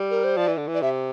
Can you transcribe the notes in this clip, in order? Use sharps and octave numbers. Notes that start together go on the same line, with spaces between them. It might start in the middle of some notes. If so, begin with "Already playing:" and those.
Already playing: G3
A#4
C5
F3 D5
E3
D3
E3
D5
C3 E5